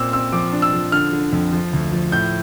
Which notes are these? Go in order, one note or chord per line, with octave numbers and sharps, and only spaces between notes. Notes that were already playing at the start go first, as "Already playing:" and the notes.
Already playing: A#2 C4 D6 E6
C4 E6
F3 D6
D4
E6
F3
D3 F6
D3
F2
F3
D2
F3
A2 G6